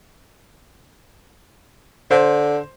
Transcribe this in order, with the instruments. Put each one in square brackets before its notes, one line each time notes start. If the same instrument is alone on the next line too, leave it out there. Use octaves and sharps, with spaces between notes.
[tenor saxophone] D3 [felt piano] C5